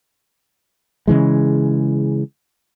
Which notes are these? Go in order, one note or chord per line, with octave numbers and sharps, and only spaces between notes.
C#3 E3 G#3